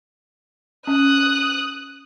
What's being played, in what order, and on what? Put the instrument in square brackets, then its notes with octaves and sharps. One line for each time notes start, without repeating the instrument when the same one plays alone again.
[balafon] C#4 [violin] D#6 F#6